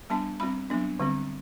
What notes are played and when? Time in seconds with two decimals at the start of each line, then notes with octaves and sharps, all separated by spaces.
0.10 G3 B3 D4 A5
0.40 G3 C4 B5
0.70 F#3 B3 D4
1.00 D3 G3 C4